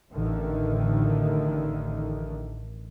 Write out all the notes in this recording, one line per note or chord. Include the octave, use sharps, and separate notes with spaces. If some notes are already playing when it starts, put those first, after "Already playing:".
A1 D3 D#3